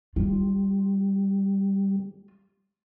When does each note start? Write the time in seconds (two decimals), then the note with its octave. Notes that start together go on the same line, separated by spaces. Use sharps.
0.16 G3 F4